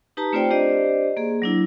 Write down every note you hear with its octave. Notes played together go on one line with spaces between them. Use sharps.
D#4 G4 B4 A5 A#5
A3 C4 F4 C5 D5 G5
D4 G4 C5 D5 D#5
A#3 G#4
F#3 D4 E4